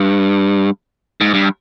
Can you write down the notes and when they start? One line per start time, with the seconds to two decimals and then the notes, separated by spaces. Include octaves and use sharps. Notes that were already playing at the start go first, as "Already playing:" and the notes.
Already playing: G2
1.21 G#2
1.34 G2